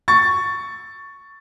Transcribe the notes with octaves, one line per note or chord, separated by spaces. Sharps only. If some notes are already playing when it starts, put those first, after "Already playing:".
C#6 A6